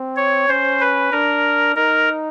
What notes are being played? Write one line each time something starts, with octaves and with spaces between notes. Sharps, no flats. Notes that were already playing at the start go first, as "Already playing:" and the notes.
Already playing: C4
C#5
C#4 C5
B4
D4 A#4
D#4 A#4